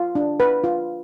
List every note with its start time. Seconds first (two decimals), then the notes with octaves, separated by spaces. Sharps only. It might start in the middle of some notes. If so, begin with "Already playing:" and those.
Already playing: F4
0.15 D4
0.40 B4
0.64 F4